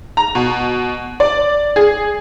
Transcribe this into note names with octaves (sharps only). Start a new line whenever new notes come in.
A#5
B2
D5
G#4